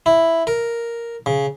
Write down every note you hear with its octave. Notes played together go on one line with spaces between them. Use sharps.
E4
A#4
C#3